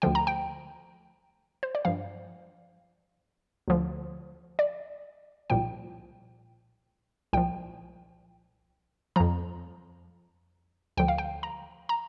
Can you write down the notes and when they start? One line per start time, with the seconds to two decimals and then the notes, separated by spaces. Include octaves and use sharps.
0.02 D2 D3 F3 G5
0.15 A#5
0.27 G5
1.63 C5
1.75 D5
1.85 G2 F3 F5
3.68 D2 D3 F3
4.59 D5
5.50 C2 A#2 F3 G5
7.33 C2 A#2 F3 G5
9.16 F2 F3 A#5
10.97 D2 D3 F3 G5
11.08 F5
11.18 G5
11.43 A#5
11.89 A#5